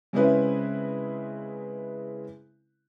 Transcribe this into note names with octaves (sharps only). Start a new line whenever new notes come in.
C#3 G#3 C4 C#4 E4 B4